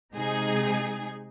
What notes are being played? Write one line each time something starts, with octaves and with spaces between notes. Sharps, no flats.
C3 G#3 D#4 G#4